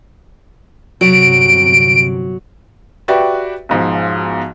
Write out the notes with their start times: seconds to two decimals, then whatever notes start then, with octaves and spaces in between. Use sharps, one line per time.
1.01 G1 C3 F#3 D7
3.08 F#4 G4 B4 D5 E5 G5
3.69 B1 G#2 F3